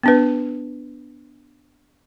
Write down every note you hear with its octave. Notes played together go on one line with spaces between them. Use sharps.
B3 D4 B4